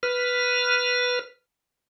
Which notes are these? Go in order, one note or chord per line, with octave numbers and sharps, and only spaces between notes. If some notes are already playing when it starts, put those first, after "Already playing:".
B4 F6